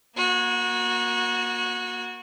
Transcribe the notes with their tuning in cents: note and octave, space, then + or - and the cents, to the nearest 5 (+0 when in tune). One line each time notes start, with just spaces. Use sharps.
A#3 +30 F#4 -25